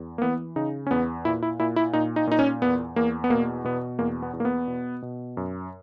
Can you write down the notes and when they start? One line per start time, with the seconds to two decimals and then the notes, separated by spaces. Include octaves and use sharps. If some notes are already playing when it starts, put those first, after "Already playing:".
Already playing: E2
0.18 A#3
0.22 E3 B3
0.56 C#3 D#4
0.87 C#4
0.91 E2 B3
1.25 A#2 E4
1.43 E4
1.60 A#2 E4
1.76 E4
1.93 A#2 D#4
2.16 D#4
2.27 A#2 D#4
2.39 C#4
2.62 E2 B3
2.96 E2 A#3
3.24 B3
3.30 B2 A#3
3.64 B2 B3
3.99 E2 A#3
4.22 B3
4.33 E2
4.40 A#3
4.45 B3
4.68 B2
5.02 B2
5.37 F#2